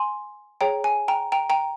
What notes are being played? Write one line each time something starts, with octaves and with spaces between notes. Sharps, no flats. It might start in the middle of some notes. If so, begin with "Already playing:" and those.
Already playing: G#5 C6
G#4 C#5 G5 A#5
G#5
G5 A#5
G5 A#5
G5 A#5